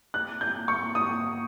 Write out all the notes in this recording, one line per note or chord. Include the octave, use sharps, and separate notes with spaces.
F#6
G6
C#6
D#6